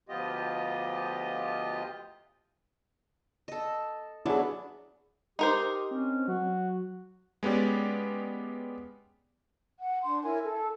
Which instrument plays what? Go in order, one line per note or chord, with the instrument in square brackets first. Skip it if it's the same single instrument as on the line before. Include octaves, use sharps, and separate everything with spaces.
[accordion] D2 F3 B3 F4 G4 D#5
[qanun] A4 D#5
[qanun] F#3 B3 D4 [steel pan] E4 G#4
[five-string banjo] D#4 A#4 C5 [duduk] G4 [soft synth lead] C6
[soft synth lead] C4 [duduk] C#4
[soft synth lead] F#3 [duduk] F#4
[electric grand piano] G#3 B3 C#4 G4 D5
[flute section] F#5
D4 C6
E4 A#4 C#5 G#5
A4